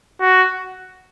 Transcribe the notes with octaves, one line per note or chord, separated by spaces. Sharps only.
F#4